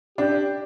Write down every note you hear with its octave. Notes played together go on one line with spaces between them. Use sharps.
D4 G4